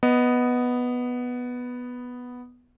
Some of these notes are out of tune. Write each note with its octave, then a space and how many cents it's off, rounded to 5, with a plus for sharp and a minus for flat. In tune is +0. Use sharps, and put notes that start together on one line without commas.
B3 +0 D#5 +0